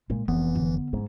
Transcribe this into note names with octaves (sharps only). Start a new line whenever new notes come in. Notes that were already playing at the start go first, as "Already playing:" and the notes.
A#2 G#3
F1 E3 B3 C4
D3
G#2 F#3 E4